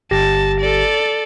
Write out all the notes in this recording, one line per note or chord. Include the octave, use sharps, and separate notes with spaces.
G1 G4 A5 A#6
A4 D5